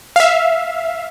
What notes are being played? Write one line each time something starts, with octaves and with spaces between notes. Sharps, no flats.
E5 F5